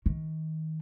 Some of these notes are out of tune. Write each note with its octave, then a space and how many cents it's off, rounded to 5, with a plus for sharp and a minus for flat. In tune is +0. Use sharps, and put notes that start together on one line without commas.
D#3 +25